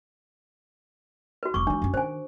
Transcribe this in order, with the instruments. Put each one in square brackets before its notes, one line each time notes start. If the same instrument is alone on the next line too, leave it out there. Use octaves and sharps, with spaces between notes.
[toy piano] F#4 B4
[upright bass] F1 G#3 [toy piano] C#6 D6
[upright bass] E3 G#3 [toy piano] D4
[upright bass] F#2 C#4
[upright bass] D#3 [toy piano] C5 G#5